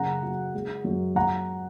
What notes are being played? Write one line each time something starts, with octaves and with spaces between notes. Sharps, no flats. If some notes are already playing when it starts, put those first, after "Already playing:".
Already playing: F#1 C#3 F#5 A#5
F#3
G#3
F#2
F#2 F#5 A#5